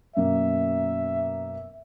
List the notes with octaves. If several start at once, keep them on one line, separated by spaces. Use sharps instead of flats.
F#2 B2 A#3 E5